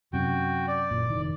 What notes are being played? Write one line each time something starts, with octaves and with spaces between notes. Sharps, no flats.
F#2 C3 F#4 G5
D5
F#1 A#2
F1 D#3